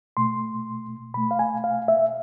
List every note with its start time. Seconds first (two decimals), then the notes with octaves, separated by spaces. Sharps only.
0.17 B2 A3 C6
1.14 B2 A3 B5
1.31 F5
1.39 G#5
1.64 F5
1.88 E5